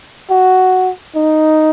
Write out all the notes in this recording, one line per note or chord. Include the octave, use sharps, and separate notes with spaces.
F#4
D#4